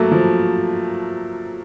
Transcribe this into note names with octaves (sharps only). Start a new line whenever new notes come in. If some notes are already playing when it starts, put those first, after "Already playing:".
Already playing: F#3 A3 A#3
F3